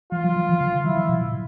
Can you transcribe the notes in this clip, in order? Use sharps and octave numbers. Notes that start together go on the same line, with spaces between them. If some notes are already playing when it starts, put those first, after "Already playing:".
F3 F4
F#3
F3
D#3
D3
D#3
F#3 E4
F3
B2
A#2